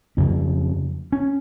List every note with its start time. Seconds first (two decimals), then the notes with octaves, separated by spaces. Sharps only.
0.17 F2 C#3 C#4
1.12 C#4